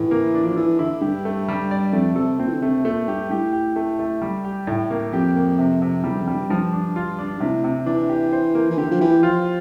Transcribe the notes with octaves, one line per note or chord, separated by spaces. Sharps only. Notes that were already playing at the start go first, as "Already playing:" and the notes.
Already playing: A2 E3
A#3
D4
F3
E3 A4
D3 E4
G2 G4
A3
G3
D5
F2 A3
C3 A4
A#2 C4
E3
D3
C3 A3
A#2 A3
G2 G4
A2 G4
G4
A3
A3
G3
G4
A2
A#3
F2 G4
A#3
C3
C3
E2 G3
G2
F2
G3
G2
G2 F3
D4
F4
D4
G2
A2 C3
C3
E3 D4
G4
C5
A#3
E3
D3 G4
F3
E3 G4
F3 F4